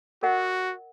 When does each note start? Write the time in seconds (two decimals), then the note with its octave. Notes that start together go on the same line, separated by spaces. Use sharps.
0.23 F#4 A#4 D#5 F#5